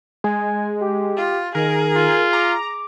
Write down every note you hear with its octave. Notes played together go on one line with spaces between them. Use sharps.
G#3 G#5
G4
F4
D#3 G#4 A#4
F4
A#5 D6